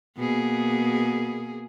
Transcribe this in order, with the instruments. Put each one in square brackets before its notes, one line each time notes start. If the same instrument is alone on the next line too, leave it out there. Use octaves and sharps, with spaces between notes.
[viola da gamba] B2 A#3 G#4